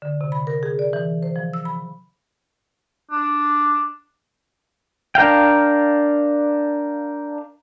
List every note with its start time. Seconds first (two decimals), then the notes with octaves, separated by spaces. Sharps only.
0.02 D3
0.21 C3
0.32 B5
0.47 A#4
0.63 G#4
0.79 D5
0.93 E3
1.23 C5
1.36 F3
1.53 E6
1.65 B5
3.12 D4
5.15 D4 A#4 F5 G5